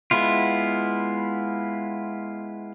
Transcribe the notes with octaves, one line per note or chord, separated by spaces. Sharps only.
G#3 B3 E4 F4